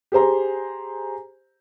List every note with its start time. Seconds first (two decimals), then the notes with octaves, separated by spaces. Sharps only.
0.12 G4 G#4 C5 A#5